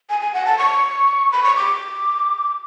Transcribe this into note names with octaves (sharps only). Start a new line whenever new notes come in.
G#5
G#5
F#5
A5
C#6
B5
C#6
D6